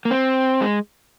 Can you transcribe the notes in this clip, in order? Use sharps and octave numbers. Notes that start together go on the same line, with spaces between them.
A#3
C4
G#3